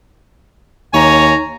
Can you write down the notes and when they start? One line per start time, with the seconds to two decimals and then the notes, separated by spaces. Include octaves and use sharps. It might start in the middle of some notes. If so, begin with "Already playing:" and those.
0.94 D#2 C#5 G#5 A#5